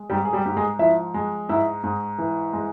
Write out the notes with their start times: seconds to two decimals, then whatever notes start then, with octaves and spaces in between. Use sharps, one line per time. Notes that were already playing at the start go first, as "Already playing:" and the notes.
Already playing: G#3
0.10 G#2 G3 G4
0.25 G#4
0.33 G3 G4
0.45 G#2 G4
0.57 G#3 G#4
0.79 F3 E4 E5
1.14 G#3
1.49 G#2 E4 E5
1.83 G#2
2.18 E3
2.53 G#3